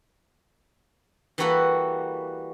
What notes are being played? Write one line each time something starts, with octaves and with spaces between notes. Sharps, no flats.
E3 G3 A#3 F#4 A4 B4